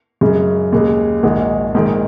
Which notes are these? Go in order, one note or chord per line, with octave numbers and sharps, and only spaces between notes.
F#2 C#3 G#3
D#2 C#3 G#3
A#1 G#2 D#3 G#3 F#4
A#1 G#2 D#3 G#3